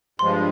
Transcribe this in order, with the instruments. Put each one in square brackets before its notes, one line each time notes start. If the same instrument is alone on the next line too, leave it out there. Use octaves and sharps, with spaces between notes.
[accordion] G2 F3 G#3 [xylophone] C6